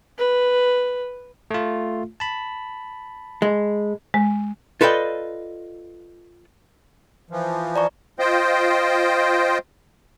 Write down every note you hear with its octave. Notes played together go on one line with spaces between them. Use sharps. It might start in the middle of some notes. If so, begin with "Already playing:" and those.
B4
A3 F4
A5 B5
G#3
G#3
F4 A4 B4 D5 D#5 G5
E3 F3
D5 A#5 C#6
F4 C5 D#5 G5